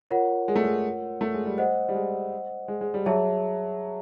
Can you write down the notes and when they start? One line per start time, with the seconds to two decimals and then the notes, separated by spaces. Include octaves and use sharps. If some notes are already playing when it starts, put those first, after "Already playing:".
0.11 F4 A#4 C#5 F#5
0.48 G#3
0.56 A3
0.64 G#3
1.21 A3
1.34 G#3
1.46 G3
1.58 C5 D#5 F#5
1.89 G3
1.95 G#3
2.68 G#3
2.81 G#3
2.94 G3
3.06 F#3 G#4 C#5 E5 A5